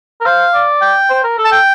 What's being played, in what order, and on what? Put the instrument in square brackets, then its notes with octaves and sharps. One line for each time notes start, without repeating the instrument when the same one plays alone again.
[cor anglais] A#4
[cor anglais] C5 [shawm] F5
[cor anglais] D5
[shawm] G5
[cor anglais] C5
A#4
A4
[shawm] A5
G5